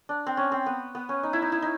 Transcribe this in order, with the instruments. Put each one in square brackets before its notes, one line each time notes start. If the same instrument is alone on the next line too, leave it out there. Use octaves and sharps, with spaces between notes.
[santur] D4
C4
C#4
C4
B3
B3
C#4
D#4
E4
D#4
E4
D#4